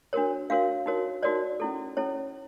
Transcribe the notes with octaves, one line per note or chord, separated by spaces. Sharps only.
D4 F#4 A#4 C#5
D4 F#4 A#4 C#5 F5
D#4 F#4 A#4 C#5
D#4 F#4 A#4 C#5 D5
C#4 E4 A4
C#4 E4 A4 C#5